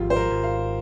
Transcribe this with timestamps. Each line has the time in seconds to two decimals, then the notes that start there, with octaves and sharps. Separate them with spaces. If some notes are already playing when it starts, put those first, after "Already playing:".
Already playing: G#1 F3 F4 G4
0.10 C5
0.16 A#4
0.31 G#1
0.43 F5